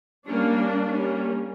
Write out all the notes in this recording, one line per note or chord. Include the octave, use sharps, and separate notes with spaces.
G3 A#3 C#4 D4
G3 A#3 C#4